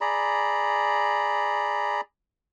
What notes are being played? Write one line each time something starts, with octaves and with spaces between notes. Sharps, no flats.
G#4 D5 A#5 B5